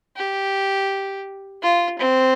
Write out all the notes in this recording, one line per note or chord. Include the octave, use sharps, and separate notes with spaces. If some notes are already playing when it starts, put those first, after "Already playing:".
G4
F4
C4